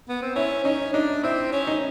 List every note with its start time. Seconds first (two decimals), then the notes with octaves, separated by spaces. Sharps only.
0.09 B3
0.22 C4
0.36 C#4 E4
0.64 C#4 D#4
0.93 D4 D#4
1.23 C4 E4
1.52 C#4
1.67 D#4